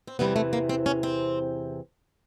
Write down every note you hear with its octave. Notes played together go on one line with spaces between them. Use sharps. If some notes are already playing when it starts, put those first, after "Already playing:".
C4
E2 C3 E3 G3 B3
A3
A#3
C4
C#4
C4